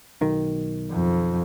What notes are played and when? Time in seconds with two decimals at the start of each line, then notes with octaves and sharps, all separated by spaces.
0.21 B1 D#3
0.92 F2